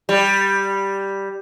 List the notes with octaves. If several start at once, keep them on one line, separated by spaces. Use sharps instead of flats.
G3